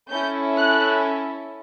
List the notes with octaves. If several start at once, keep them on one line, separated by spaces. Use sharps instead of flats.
C#4 E4 A4 G6
F#6